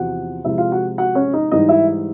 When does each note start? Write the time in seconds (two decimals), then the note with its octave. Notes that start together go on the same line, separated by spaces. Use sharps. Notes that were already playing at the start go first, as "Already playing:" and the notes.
Already playing: E2 C3 F3 F#4 F#5
0.45 C3 F3 G#3 C4 E4 E5
0.58 F4 F5
0.72 F#4 F#5
0.98 F#4 F#5
1.15 C#4 C#5
1.33 D#4 D#5
1.51 G#2 E3 G3 D#4 D#5
1.69 E4 E5